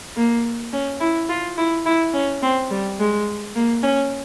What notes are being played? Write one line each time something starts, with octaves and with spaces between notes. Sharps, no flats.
A#3
C#4
E4
F4
E4
E4
C#4
C4
G3
G#3
A#3
C#4